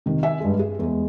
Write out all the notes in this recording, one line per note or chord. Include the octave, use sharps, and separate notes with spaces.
C3 D#3
E5 G#5
G2 G#3
G#4
E2 G#3